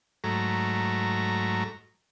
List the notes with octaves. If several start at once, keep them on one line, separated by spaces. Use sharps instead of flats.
G#2 F#3 A3 A#5